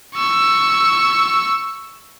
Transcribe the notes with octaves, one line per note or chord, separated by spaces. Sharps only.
C#6 E6